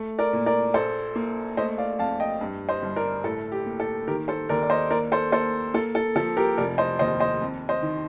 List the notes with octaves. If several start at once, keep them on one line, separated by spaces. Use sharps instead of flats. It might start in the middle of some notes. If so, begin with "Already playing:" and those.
Already playing: A3
A#4 D5
A#2
A#4 D5
A#1 A4 C5
A#3
A3 C5 D#5
D5 F5
F2 F5 A5
D#5 G5
G2
C5 D#5
G1
A#4 D5
A2 A4
G4
A#3
A4
D#3 G4 A#4
A4 C5
D#2 A#4 D5
D5
C5 D#5
A#3 A#4 D5
A4 C5
A#3 A4 C5
A#3 A4
A4
F3 A4
G4 A#4
F1 A#4 D5
C5 D#5
D#2 C5 D#5
C5 D#5
F2
C5 D#5
D#3